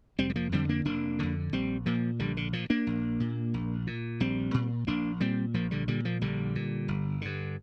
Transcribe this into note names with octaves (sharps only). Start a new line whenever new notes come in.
F1 G3 C4
G3
F3 A#3
F2 D3 G3 C4
A#3 D4
F1 A#3 D4
F2 D3
A#1 G3 C4
A#2 F3 A#3
A#1 D3 G3
D3
A#2 F3
A#3 D4
A#1
A#2
A#1
A#2
A#1 G3 C4
A#2
A#1 A#3 D4
A#2 G3 C4
A#1 F3 A#3
D3 G3
A#2 D3 G3
F3 A#3
A#1 D3 G3
A#2
G1
G2 D3